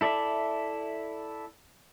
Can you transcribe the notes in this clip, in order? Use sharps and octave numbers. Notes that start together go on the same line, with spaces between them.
E4 A4 D5 E5